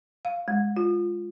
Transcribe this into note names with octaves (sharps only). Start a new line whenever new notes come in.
F5
G#3
F4